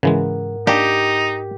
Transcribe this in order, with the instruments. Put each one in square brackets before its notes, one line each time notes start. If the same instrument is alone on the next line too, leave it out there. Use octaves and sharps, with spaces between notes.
[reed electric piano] G#2 A#4 F#5 [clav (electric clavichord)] C#3 E3 G#3
[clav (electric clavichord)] A#3 D4 D5 [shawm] D#4 [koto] G4